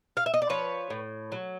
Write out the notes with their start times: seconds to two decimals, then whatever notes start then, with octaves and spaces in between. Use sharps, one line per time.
0.17 F5
0.26 E5
0.34 D#5
0.42 D5
0.49 F3 B4 C#5
0.90 A2
1.32 F#3